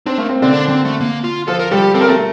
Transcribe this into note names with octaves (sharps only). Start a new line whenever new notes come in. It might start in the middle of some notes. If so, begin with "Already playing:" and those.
C4 D4
A3 A#3
C4
D3 C4 D4
D4
C4
A3
A#3
F4
F3 F4 A4
A#4
G3 G4 A4
G4
C4 A4
A#4
A3 A4